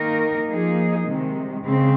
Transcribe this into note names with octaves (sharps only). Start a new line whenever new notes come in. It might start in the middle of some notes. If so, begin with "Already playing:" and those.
Already playing: D#3 A#3 D#4 A#4
F3 A#3 D#4 G#4
C3 D#3 G#3
C#3 G#3 C4